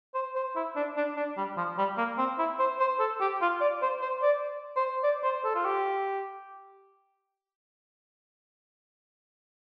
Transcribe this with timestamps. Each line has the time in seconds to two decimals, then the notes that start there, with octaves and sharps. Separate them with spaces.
0.14 C5
0.36 C5
0.56 E4
0.76 D4
0.97 D4
1.17 D4
1.37 G3
1.57 F3
1.78 G3
1.97 A#3
2.18 C4
2.38 E4
2.59 C5
2.80 C5
2.99 A4
3.21 G4
3.41 F4
3.61 D5
3.82 C5
4.02 C5
4.22 D5
4.76 C5
5.03 D5
5.24 C5
5.44 A4
5.55 F4
5.65 G4